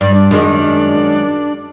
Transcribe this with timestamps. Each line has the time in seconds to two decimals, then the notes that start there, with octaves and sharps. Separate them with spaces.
0.01 G2 D5
0.14 D4
0.31 F#2 D#3 G#3